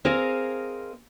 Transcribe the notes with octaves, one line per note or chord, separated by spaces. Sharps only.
C4 G#4 A#4 D#5 F5